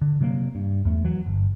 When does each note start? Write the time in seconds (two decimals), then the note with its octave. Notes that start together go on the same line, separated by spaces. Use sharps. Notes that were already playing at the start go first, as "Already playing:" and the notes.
0.02 D3
0.21 C3 F#3 G#3 A#3
0.55 G2
0.85 E2 A3
1.04 E3 F#3
1.26 G1